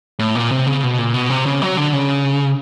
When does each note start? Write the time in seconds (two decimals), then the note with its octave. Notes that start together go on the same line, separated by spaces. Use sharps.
0.19 A2
0.35 A#2
0.51 C3
0.67 C#3
0.83 B2
0.99 A#2
1.14 B2
1.30 C3
1.46 C#3
1.62 F#3
1.77 D3
1.93 C#3